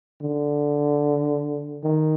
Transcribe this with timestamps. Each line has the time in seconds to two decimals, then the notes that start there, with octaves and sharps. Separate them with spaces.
0.19 D3
1.83 D#3